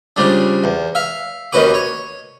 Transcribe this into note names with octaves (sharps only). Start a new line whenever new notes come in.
C#3 F3 G3 D4
E2
E5 F5
D#2 D#3 C#4 F#4 B4 D6
C#5